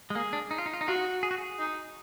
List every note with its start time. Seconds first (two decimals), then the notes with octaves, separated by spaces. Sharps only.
0.10 G#3
0.15 A#3 G#4
0.33 D4
0.51 D#4
0.58 F4
0.66 D#4
0.73 F4
0.81 D#4
0.87 F4 F#4
0.96 D#4
1.23 G#4
1.31 F#4
1.38 G#4
1.59 D#4